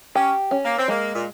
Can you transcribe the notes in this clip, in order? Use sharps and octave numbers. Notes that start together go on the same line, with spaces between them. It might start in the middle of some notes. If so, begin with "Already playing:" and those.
C#4 G4
C#4
A#3
C4
G#3 A#3
A#2